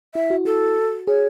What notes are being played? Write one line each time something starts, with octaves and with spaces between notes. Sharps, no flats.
E4 E5
F#4
F#4 A4
G#4 C#5